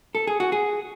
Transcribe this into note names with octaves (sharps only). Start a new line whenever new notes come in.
A4
G#4
F#4
G#4